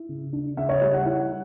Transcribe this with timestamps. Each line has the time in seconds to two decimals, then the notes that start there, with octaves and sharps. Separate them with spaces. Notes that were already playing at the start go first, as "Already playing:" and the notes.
Already playing: E4
0.09 C#3
0.33 D4
0.57 C#3 E5
0.69 C#5
0.82 G3
0.93 F#5
1.05 E4 F#5